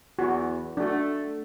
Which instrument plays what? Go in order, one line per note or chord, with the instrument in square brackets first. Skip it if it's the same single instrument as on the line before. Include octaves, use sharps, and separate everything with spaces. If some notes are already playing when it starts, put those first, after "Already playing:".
[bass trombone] E2 [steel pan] F#4
[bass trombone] A3 [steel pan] D4 F#4